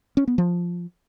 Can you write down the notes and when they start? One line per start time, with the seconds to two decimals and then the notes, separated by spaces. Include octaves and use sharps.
0.17 C#4
0.28 B3
0.38 F3